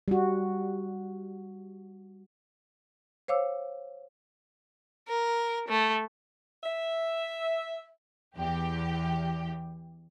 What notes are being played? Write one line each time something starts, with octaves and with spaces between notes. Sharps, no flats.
G3 F#4
C5 C#5 F5 D6 E6
A#4
A3
E5
E2 G4